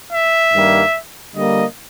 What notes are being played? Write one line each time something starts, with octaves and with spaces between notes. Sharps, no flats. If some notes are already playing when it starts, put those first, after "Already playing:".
E5
G2 D#3 G3 A#3
D3 G3 A#3 D#5